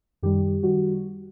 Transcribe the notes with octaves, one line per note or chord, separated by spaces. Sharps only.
F#2 D#3 G3 G4
D#3 G3 F#4